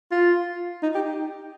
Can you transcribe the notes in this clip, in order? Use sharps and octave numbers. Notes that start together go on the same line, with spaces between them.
F4
D#4
G4